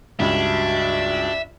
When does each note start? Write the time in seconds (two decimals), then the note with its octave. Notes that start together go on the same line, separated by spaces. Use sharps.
0.20 C#2 G2 D4 F#4 E5